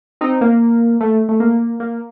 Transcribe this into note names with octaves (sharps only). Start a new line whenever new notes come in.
C4 D#4
A#3
A3
A3
A#3
A#3